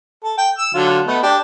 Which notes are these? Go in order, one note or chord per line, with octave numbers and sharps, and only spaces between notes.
A4
G5
E6
D3 F#3 F4
A3 B3 D#5
D4 G4